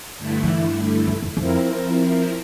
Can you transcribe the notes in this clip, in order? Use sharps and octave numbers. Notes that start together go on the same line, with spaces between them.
G2 D3 A3 E4
F3
E3
F2
F2
F2 F3 C4 E4 A#4